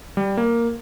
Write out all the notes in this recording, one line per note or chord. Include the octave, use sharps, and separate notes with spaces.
G3
A#3